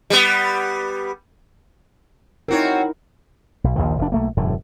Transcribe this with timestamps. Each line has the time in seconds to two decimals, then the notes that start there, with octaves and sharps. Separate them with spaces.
0.10 G3 B3
2.48 C4 D#4 E4 F#4 A#4 C#5
3.64 B1
3.76 A#1 D#2 D#3 F3
3.98 F1 D4
4.12 B1 A3 A#3
4.37 E1 F#2 A2 D3